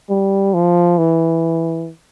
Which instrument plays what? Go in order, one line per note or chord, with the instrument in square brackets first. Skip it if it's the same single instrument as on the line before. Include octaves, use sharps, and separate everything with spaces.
[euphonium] G3
F3
E3